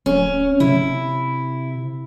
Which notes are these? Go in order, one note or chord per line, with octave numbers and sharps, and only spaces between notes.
D1 C#4
C3 E4